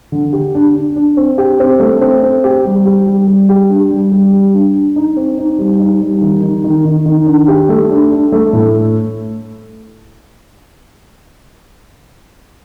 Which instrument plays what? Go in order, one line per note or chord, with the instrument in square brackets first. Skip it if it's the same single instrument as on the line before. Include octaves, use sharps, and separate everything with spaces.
[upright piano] D3
G4
D4
D4
D4
C4
G4
C4
A3
C4
C4
G4
G3
G4
G3
G3
G4
D4
G3
G3
G3
D4
D4
D#4
C4
D#4
G3
D#4
G3
D#3
D#3
D#3
D#3
D#3
D4
G4
A3
D4
D4
A3
A2